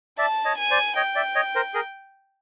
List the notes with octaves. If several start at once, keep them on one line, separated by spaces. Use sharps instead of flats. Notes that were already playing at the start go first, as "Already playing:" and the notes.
D5 E5 A5
C#5 D#5
G#5
C5 D5
C#5 D#5 G5
D5 E5
C#5 D#5
A#4 C5
G#4 A#4